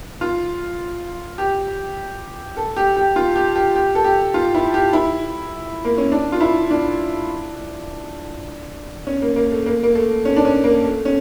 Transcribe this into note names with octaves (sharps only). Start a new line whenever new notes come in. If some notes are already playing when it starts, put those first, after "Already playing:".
F4
G4
A4
G4
G4
F4
G4
G4
G4
A4
G4
F4
E4
G4
E4
A#3
C#4
D4
F4
E4
D4
C#4
A#3
A#3
A3
A#3
A#3
A3
C#4
D4
C#4
A#3
A3
C#4